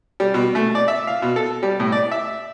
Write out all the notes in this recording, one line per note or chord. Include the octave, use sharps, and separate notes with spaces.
G3
B2
A3
D5
E5
F5
B2
A4
G3
A2
D5
E5